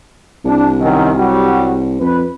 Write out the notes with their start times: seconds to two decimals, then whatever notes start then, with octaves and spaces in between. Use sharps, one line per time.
0.45 C2 D4
0.80 F#2 D#3
1.16 F#3 G3 F#4
2.00 F2 B4